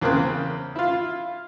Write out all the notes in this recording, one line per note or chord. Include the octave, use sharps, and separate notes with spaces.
E2 C#3 A#3 C4 F#6
E4 F4